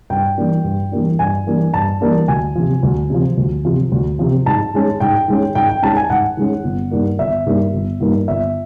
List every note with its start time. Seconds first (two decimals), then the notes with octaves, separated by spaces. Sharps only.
0.10 G2 G5
0.38 E3 G3 A#3 D4
0.64 G2
0.92 E3 G3 A#3 D4
1.19 G2 G#5
1.46 E3 G3 A#3 D4
1.74 G2 A5
2.01 E3 G3 A#3 D4
2.28 D2 G#5
2.55 C3 F3
2.83 D2
3.10 C3 F3
3.37 D2
3.65 C3 F3
3.92 D2
4.19 C3 F3
4.46 G#2 A5
4.74 D#3 G#3 C#4
5.00 G#2 G5
5.28 D#3 G#3 C#4
5.55 G#2 G5
5.69 G5
5.82 D#3 G#3 C#4 A5
5.96 G#5
6.10 G#2 F#5
6.37 D#3 G#3 C#4
6.64 G1
6.91 G2 D#3 G3 A#3
7.19 G1 E5
7.46 G2 D#3 G3 A#3
7.73 G1
8.00 G2 D#3 G3 A#3
8.28 G1 E5